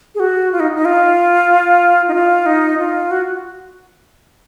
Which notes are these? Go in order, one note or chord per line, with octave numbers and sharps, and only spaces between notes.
G#4
F#4
F4
D#4
D#4
F4
D#4
F4
D#4
F4
F#4